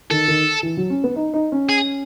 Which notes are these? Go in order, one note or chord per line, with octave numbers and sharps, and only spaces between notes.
D#3 A4
D#3
E3
F#3
C#4
B3
D#4
D#4
C#4
G#4